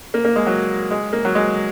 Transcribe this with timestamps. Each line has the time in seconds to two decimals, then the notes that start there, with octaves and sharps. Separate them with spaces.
0.14 A#3
0.25 A#3
0.36 G#3
0.46 F#3
0.91 G#3
1.13 A#3
1.25 F#3
1.35 G#3